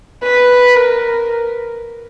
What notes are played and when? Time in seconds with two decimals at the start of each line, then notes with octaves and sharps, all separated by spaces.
0.23 B4
0.75 A#4